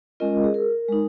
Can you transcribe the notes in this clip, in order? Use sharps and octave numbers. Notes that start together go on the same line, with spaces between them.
G#3 C#4 F4 A#4 D#5
G#4
A#4
G#3 D#4